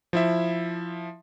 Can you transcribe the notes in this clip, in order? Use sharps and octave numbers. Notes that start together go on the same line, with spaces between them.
F3 E4 E5